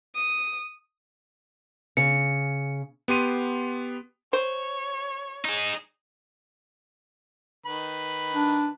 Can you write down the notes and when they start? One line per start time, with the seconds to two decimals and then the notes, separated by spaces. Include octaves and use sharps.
0.16 D#6
1.97 C#3 C#7
3.08 B3 G4 C6 D#7
4.33 C5 C#5
5.45 D#4 G#4
7.66 D#3 B4 B5
8.33 D4